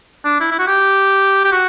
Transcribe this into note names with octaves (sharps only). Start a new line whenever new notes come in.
D4
E4
E4
F#4
G4
G4
F#4